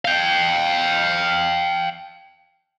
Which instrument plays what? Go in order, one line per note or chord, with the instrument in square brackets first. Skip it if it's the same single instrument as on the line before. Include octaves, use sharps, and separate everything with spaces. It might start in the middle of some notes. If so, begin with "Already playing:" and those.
[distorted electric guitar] F5 G5